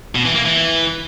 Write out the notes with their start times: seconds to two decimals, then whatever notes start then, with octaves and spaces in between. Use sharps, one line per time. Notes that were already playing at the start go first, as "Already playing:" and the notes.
0.15 B2
0.25 E3
0.35 A#3
0.45 E3